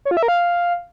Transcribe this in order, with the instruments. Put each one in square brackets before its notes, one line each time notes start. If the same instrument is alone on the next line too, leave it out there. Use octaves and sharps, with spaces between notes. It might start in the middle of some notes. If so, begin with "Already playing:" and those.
[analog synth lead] C#5
F4
E5
A#4
F5